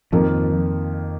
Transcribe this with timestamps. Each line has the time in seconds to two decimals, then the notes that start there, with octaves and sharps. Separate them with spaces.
0.12 F2 D#3 F3 A#3